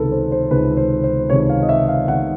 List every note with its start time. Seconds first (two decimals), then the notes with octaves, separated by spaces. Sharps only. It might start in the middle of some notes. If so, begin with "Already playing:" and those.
Already playing: C#2 C3 D#3 A4 B4
0.12 C5
0.32 C5
0.51 C#2 C3 D#3 B4
0.77 C5
1.04 C5
1.30 C#2 C3 D#3 C#5
1.49 F5
1.62 D#5
1.69 E5
1.88 F5
2.08 C3 D#3 F#5